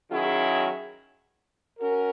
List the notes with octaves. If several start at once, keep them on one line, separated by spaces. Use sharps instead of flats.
D#3 F#3 C#4 E4 G#4
C#4 F#4 A#4